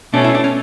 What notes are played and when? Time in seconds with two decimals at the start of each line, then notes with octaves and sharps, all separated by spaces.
0.13 B2 A3 C#4 D4
0.24 E4
0.35 D4
0.44 C#4